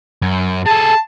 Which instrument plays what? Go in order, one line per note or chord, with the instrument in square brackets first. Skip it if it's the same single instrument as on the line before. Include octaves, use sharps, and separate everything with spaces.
[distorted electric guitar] F#2
[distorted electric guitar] G#4 A4 [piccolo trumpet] A5